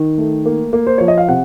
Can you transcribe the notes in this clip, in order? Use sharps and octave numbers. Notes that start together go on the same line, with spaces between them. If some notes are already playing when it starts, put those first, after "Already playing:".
Already playing: D#3
A3
A#3
A#3
C5
F3 C#5
D#5
F5
C3 F#5